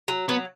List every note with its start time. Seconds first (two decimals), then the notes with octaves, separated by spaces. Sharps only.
0.08 F#3
0.28 F#3 B3